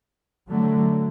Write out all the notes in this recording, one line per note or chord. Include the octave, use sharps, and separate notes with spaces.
D3 F#3 A3